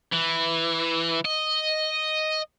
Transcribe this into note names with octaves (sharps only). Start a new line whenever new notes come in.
E3
D#5